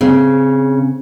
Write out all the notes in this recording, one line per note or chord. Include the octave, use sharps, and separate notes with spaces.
C#3 C4